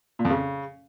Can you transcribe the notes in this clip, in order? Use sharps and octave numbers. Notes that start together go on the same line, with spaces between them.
A#2
F2
C#3